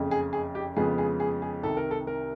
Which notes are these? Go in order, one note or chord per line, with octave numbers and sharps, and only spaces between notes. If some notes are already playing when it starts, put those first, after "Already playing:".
Already playing: F#1 F2 C#3
G#4
G#4
G4
F2 C#3 F3 G#3 B3 G#4
G#4
G#4
G#4
C2 C3 D#3 A4
A#4
A4
A#4